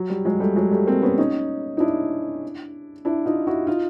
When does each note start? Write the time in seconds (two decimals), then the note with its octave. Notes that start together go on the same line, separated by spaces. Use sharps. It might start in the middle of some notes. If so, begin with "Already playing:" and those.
Already playing: F#3
0.10 G3
0.25 F#3 G#3
0.40 G3 A3
0.56 F#3 G#3
0.71 G3 A3
0.87 A#3 C4
1.02 B3 C#4
1.18 C#4 D#4
1.77 D#4
1.80 D4 E4
3.05 D4 E4
3.25 D#4 F4
3.47 E4 F#4
3.67 D#4 F4